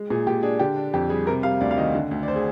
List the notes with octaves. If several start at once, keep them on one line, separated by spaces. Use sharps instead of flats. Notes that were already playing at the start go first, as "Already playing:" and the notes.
Already playing: G#3
A#2 G#4
A#2 G4
D4 G#4
D3 G4
D4
F2 G4
G3 G#4
C3 A#4
G3 F5
D2 D5
F5
D#3 D#5
D3
D2
D5
C5
G#4